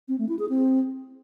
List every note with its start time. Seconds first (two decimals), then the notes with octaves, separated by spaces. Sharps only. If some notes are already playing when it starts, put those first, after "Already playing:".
0.08 C4
0.19 A3
0.29 E4
0.39 G#4
0.49 C4